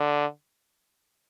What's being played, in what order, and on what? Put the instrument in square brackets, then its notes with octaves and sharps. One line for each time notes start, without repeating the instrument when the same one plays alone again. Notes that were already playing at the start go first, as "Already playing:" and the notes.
Already playing: [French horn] D3